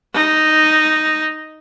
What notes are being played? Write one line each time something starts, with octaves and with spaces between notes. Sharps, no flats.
D#4